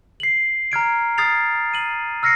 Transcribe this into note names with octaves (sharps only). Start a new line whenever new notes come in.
C7 F#7
A#5 F6 G#6 D7
D#6 F6 G#6 A6 C7 F7
D#7 F#7
E6 F6 A#6 C7 C#7